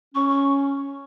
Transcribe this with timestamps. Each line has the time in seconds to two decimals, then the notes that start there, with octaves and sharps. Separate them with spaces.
0.14 C#4 C#6
0.30 C#6